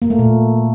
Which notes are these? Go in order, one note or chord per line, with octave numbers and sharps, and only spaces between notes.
A#3
A3
A#2